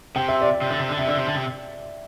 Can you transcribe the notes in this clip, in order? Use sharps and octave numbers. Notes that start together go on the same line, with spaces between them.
C3 G5
E5
D5
E5
C3
D3
C3
D3
C3 E5
D3 D5
C3
D3
C3